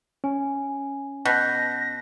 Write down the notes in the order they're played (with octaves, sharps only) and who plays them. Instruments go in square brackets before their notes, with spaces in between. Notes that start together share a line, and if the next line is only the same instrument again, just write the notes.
[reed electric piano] C#4 [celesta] G#5
[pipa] B2 [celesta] F#6 G6 B6 [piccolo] A#6